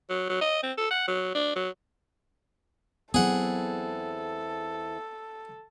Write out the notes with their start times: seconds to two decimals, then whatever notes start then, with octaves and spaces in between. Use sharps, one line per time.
0.10 F#3
0.29 F#3
0.41 D#5
0.63 C4
0.78 A4
0.91 F#5
1.08 F#3
1.35 D4
1.56 F#3
3.14 E2 F#3 B3 C4 E4 G#4 A4 F#5